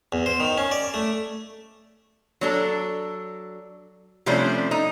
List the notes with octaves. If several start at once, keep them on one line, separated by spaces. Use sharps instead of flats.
E2
C5
D#3
C#4
D5
A3
F#3 D4 A4
C3 F3 G3 A3 C#4 D4
D#4